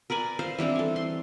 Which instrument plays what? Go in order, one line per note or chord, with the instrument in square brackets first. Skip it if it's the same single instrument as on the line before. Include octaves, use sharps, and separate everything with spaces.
[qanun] A#4 B4 D5 G#5
C5 F5
E3 G3 C4 D4
A4 G#5
C6